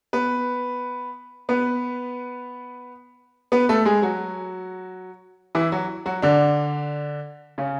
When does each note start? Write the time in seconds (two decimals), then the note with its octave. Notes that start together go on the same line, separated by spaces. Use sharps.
0.13 B3 B4
1.49 B3 B4
3.52 B3 B4
3.69 A3 A4
3.85 G#3 G#4
4.02 F#3 F#4
5.55 E3 E4
5.72 F#3 F#4
6.06 F#3 F#4
6.22 D3 D4
7.58 C#3 C#4